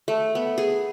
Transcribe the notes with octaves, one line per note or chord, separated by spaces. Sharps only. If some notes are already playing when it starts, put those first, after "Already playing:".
A3
B3
G#4